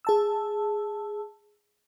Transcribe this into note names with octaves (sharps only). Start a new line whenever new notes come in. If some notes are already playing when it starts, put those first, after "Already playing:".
G#4 A5 E6